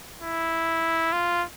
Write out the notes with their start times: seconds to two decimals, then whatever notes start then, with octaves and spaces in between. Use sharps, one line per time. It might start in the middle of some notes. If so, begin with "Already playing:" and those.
0.22 E4
1.13 F4